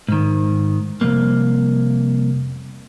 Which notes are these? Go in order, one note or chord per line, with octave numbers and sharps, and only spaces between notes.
G#2 D#3
C2 F2 A#3